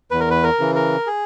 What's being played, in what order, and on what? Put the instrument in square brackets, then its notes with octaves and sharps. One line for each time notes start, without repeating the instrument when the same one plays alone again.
[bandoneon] E2 B4
A#4
B4
A#4
C#3 E3
A#4
G#4